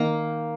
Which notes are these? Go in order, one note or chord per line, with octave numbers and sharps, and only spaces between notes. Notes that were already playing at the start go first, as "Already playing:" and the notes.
Already playing: D#3 A#3 A#5